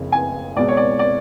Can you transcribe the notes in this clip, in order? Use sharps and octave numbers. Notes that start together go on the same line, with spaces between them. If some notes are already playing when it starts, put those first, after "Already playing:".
Already playing: F#1 F2 C#3
G#5
C#2 B2 G#3 D5
C#5
D5
D5